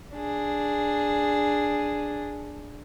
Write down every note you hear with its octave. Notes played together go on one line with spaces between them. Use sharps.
D4 G#4